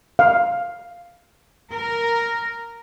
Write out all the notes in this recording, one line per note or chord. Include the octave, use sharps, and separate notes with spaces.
F5
A#4